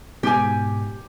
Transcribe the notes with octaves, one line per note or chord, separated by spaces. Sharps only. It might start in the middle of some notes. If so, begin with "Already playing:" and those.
G#2 B2 G4 G#5